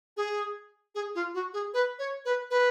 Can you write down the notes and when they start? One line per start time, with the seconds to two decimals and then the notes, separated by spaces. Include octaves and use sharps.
0.17 G#4
0.95 G#4
1.15 F4
1.34 F#4
1.54 G#4
1.74 B4
1.99 C#5
2.25 B4
2.51 B4